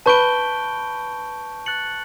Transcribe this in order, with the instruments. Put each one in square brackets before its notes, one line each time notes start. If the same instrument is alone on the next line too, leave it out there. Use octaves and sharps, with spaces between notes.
[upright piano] B4 [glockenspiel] A5 C#6 G6 D7 G7
[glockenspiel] F#6 A6 C#7 F#7